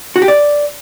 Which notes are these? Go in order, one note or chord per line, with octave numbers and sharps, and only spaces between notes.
F#4
G4
D5